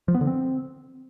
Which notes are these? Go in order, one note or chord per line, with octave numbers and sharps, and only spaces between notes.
F3
B3
D3
C4